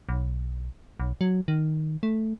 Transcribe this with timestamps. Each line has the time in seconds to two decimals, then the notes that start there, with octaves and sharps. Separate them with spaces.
0.09 B1
1.00 B1
1.21 F#3
1.48 D#3
2.03 A3